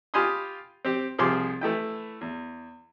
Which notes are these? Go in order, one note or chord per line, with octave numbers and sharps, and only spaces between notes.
F4 G4 G#5 B5 C6 D#6
C4 G4
C2 F3 G4 G#4 C6 D6
E3 A3 E4 G5
E2